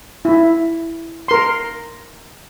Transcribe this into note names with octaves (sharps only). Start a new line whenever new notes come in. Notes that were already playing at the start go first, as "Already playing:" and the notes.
E4
A#4 C6